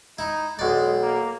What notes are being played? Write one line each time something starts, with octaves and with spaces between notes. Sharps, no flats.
D#4 E4
B1 G#3 D5
A#3